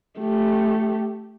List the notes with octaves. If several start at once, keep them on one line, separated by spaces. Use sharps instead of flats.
A3 G4